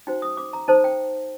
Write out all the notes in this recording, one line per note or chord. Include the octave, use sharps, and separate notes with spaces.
D#4 F#4 C5 G5
D#6
D6
A#5
D#4 A4 C5 A5
G5